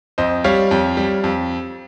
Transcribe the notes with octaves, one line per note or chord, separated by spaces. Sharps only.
F2 C5 D#5
G3 C#5 F5
F2
G3
F2